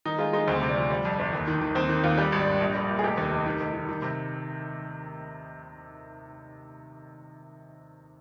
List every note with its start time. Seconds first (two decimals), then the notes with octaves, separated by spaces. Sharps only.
0.05 D#3 D#4
0.19 G#3 F4
0.33 G#3 D#4
0.48 D2 C4
0.62 C3
0.69 D4
0.76 F3
0.90 G3
1.05 F2
1.19 G1
1.33 D#2
1.47 D#3
1.61 D#3
1.75 D#2 C4
1.89 D#3
2.04 D#2 F4
2.18 G3 G4
2.32 G#1
2.40 D4
2.47 G2
2.60 A#1
2.75 G3
2.89 A#2
2.99 G#4
3.04 F1 G4
3.17 D#2
3.31 F1
3.46 D#3
3.60 F1
3.74 D#3
3.89 D#3
4.02 C3